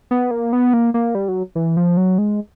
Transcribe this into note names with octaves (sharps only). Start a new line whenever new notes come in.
B3
A#3
B3
A#3
A#3
G3
F#3
E3
F3
F#3
G#3